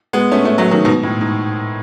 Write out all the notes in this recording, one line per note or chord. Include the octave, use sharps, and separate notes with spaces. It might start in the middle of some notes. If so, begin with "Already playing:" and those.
G#3 B3
A3 C#4
A3 C#4
F#3 A3
D#3 F#3
G#2 B2
A2
G#2